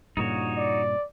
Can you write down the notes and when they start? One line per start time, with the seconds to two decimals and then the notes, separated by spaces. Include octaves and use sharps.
0.17 G2 A#2 C#3 D#4 F#4 C#5
0.57 D5